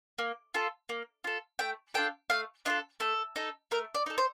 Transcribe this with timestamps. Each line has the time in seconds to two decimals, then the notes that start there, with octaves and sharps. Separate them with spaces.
0.18 A#3
0.54 F4 A4
0.89 A#3
1.24 F4 A4
1.59 A3 G5
1.94 D4 F4 A4 G5
2.30 A3 F5
2.65 D4 F4 A4 D#5
3.00 A3 A4
3.36 D#4 A4
3.71 A3 A#4
3.95 D5
4.06 D#4 A4
4.18 C5